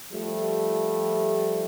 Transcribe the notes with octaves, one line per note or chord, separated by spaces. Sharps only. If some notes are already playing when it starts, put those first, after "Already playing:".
F3 G3 A3